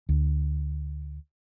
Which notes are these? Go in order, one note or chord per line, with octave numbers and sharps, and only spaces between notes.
D2